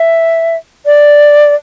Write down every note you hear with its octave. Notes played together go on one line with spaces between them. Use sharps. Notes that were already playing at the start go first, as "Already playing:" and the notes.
Already playing: E5
D5